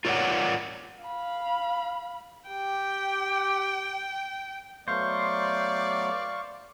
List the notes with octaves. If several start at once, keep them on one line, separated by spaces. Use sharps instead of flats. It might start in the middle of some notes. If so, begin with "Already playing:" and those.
F4 A#4 C#5 D5 F#5
F5 B5
G4 G5
F#3 A3 B3 C5 D5 F5 C#6